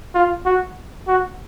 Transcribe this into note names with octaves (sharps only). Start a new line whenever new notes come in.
F4
F#4
F#4